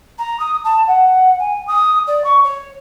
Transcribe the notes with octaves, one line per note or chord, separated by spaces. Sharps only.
A#5
D#6
A5
F#5
G#5
D#6
D5
C#6
C#5